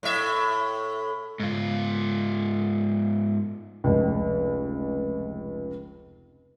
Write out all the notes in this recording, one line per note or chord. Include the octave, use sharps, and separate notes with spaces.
A2 E5
G#2 F4
F1 C#2